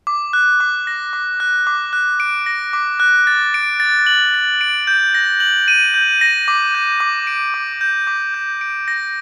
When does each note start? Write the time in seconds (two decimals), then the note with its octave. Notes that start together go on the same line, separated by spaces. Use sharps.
0.07 D6
0.33 F#6
0.60 D6
0.87 A#6
1.13 D6
1.40 F#6
1.67 D6
1.93 F#6
2.20 D7
2.46 A#6
2.73 D6
3.00 F#6
3.27 A6
3.54 D7
3.80 A6
4.07 F#7
4.34 A6
4.61 D7
4.87 G6
5.15 A#6
5.40 F#7
5.68 D#7
5.94 G6
6.21 A#6
6.48 D6
6.75 G6
7.00 D6
7.27 D7
7.54 D6
7.81 G6
8.07 D6
8.34 G6
8.61 D7
8.88 A#6